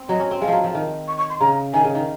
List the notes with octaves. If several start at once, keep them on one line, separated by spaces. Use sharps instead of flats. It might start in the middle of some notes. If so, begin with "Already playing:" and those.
Already playing: C4
F#3 D#5
C#4
C4
G#3 F5
F3 F#3
F3
D#3
C#6
C#6
C6
C#3 A#5
D#3 G#5
C#3
D#3